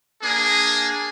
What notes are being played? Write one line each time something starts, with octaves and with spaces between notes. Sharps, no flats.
A#3 D4 G#4